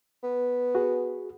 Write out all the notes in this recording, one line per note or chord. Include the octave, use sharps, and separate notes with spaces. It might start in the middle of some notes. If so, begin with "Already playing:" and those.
B3
F#4 G#4